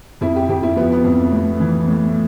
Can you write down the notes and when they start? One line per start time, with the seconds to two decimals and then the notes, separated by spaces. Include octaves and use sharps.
0.21 F2 E4
0.36 G4
0.49 F2 G4
0.63 E4
0.76 F3 B3
0.92 B3
1.04 F2
1.32 A2
1.60 E3
1.88 A2